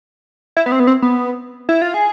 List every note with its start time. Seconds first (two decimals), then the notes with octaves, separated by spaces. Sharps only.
0.57 E4
0.66 B3
0.72 C4
0.80 B3
0.87 C4
1.02 B3
1.69 E4
1.82 F4
1.94 G#4